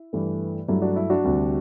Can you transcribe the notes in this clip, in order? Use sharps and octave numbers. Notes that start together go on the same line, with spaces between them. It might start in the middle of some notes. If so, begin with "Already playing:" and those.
Already playing: E4
G2 E3 A3
G2 F#3 A3 E4
D4 F#4
E4
D4 F#4
D2 C3 G3